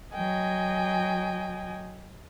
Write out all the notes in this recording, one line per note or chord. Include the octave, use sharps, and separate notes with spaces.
F#3 D#5 G5 G#5